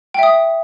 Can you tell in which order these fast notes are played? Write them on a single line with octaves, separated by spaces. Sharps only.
G5 E5 D#6